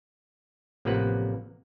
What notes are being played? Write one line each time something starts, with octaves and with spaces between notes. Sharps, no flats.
A1 C3 F3 A#3 B4 F#5